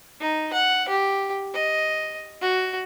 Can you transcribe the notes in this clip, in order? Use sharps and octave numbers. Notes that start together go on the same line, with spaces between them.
D#4
F#5
G4
D#5
F#4